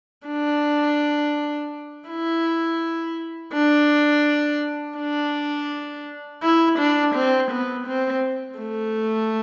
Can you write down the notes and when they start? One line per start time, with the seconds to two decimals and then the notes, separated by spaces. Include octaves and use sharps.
0.27 D4
2.09 E4
3.53 D4
4.98 D4
6.43 E4
6.78 D4
7.15 C4
7.51 B3
7.87 C4
8.59 A3